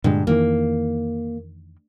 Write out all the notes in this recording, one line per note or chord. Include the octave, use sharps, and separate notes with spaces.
G2 A#2 D3 G#3
F2 D#3 E3 A#3